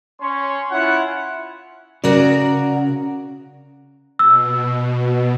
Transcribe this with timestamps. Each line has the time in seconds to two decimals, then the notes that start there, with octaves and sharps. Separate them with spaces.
0.20 C#4 C#5 C6
0.71 C#4 E4 F4 F#5
2.04 C#3 F#4 A#4 D5
4.19 B2 E6